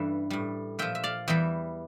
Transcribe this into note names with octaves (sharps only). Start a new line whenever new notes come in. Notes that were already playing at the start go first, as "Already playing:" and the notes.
Already playing: G2 E3 G3 C#4 A4 E5
A2 G3
A#2 F3 E5 G5
E5
D5 F5
E2 E3 G3 E5 G5